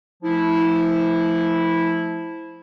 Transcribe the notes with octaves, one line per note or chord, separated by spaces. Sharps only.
F3 A3 E4